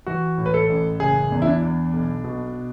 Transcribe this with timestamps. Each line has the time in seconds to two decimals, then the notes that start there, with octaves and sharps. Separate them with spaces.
0.06 E3 F#4
0.38 A2
0.46 B4
0.54 A4
0.69 A1
1.00 F#1 G#4
1.32 E2
1.42 E4
1.47 D4
1.62 E2
1.93 B1
2.24 B2